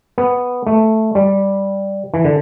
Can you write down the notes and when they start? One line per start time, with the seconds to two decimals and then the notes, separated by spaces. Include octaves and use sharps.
0.18 B3
0.67 A3
1.15 G3
2.14 E3
2.25 D3